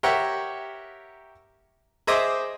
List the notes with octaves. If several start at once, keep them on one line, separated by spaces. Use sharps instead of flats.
G4 A#4 C#5 E5 F#5
G#4 C5 D#5 E5 D6 D#6